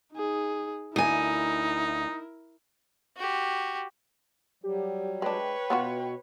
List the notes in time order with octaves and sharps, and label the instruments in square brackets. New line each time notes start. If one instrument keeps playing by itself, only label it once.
[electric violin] D#4 G#4
[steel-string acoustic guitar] D2 G#5 [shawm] D#4 [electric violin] E4 A#4
[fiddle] F#4 G4
[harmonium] F#3 G3 [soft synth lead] G4
[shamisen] G#3 D4 [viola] B4 C#5 [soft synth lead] G5
[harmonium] B2 [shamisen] B3 F4 F#4